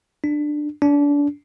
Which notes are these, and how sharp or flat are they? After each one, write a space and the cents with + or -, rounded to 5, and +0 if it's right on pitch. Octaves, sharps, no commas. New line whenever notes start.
D4 +15
D4 -30